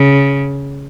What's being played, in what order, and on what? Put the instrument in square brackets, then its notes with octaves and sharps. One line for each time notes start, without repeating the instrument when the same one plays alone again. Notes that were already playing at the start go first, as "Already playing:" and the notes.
Already playing: [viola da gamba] C#3